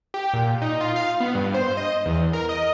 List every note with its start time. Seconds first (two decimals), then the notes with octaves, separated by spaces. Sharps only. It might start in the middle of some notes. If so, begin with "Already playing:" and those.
0.14 G4
0.33 A#2
0.62 D#4
0.81 F4
0.96 F5
1.20 B3
1.35 G2
1.54 C5
1.77 D#5
2.06 E2
2.33 A#4
2.49 D#5